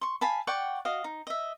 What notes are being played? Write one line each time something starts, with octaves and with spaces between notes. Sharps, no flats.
C6 C#6
F5 G#5 A5 B5
D5 F#5 G5 C#6
F#4 D#5 F5
D#4
D#5 E5